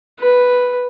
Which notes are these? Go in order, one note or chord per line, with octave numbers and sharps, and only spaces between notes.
B4